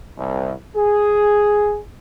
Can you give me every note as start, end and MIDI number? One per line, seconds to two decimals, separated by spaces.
0.16 0.52 36
0.75 1.79 68